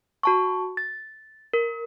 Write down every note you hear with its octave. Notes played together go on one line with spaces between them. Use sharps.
F#4 A5 C#6
A6
A#4